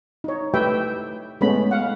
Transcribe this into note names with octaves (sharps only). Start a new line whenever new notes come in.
D#4 C#5
A3 G4 B4 E5 G5
G#3 A3 B3 C#4 B5
F5 F#5